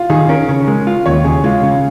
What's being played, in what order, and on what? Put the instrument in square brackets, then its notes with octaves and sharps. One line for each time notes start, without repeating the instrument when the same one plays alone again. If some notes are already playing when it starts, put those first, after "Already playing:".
Already playing: [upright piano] F4
[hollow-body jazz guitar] D#3 [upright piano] G#4
[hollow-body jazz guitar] C#4 [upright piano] A#4
[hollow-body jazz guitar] C#3
G#3
F4
[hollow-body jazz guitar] D#2 [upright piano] C#5
[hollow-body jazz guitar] C#3 [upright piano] G#4
[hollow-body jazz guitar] G#3 [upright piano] F4
[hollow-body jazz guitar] C#3